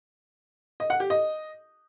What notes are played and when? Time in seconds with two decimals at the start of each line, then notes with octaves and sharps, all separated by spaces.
0.80 D#5
0.90 F#5
1.00 G4
1.10 D#5